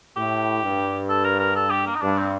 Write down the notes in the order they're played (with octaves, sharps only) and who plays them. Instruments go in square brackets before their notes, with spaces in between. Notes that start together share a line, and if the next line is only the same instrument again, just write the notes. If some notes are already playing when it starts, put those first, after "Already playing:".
[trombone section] A2 [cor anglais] G4
[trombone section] G2
[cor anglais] A4
A#4
A#4
A4
G4
A#3
D#4
[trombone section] G2 [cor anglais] D4
[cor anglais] C4